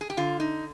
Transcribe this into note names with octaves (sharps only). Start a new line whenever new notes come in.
G#4
G4
D3 F4
D#4